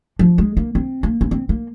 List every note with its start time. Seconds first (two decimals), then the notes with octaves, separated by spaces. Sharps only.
0.19 F3
0.38 G#3
0.57 A#3
0.75 C4
1.03 A#3
1.21 C#4
1.31 C4
1.49 A#3